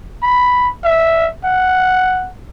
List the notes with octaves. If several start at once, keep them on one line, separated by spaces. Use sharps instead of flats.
B5
E5
F#5